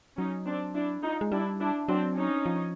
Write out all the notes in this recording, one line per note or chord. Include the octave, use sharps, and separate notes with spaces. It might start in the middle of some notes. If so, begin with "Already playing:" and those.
F#3 C#4 D#4
C4 D4
D4 E4
D#4 F4
G#3
G3 D4 E4
D4 E4
F#3 C4 D4
C#4 D#4
F3